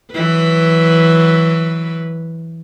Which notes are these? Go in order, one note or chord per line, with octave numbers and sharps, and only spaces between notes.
E3 F#3 B4